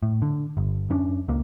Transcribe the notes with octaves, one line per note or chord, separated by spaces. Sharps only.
A2
D3
G1
F#2 C#4 D4
C#2 A#3